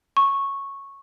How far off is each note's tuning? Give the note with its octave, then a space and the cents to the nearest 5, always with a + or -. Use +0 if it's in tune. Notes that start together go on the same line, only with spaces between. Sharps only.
C#6 -10